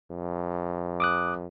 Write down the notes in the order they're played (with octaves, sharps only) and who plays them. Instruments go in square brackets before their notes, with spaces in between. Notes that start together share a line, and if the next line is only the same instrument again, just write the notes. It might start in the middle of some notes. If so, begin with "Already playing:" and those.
[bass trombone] F2
[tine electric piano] D6 D#6 F#6